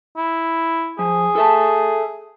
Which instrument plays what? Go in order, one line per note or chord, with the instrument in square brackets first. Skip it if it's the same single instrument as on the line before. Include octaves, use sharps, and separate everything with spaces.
[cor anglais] E4
[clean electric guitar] F3 [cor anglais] G#4
[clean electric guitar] A4 E5 A5